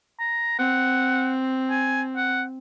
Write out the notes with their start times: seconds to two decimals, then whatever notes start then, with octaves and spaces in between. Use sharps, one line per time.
0.20 A#5
0.59 C4 F#5
1.70 G#5
2.16 F#5